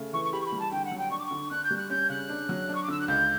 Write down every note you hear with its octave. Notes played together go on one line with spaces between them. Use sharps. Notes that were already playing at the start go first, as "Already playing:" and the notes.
Already playing: C#3 A3
E3 C#6
C#6
G4 B5
C#6
B5
G3
A5
D3 G5
F#5
F#3
G5
D4 C#6
D6
D3 C#6
D4 F#6
G6
G3
F#6
C#4 G6
C#3 F#6
D4
F#3
D4
C#6
D6
D3 E6
F#6
C#2 G6